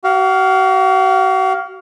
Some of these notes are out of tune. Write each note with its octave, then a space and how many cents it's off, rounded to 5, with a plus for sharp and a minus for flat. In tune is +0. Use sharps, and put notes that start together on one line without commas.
F#4 +40 F5 +0